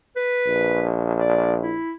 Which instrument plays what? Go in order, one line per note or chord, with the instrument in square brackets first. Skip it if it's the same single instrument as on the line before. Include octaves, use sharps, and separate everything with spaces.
[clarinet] B4
[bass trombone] A#1
[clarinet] D5
E4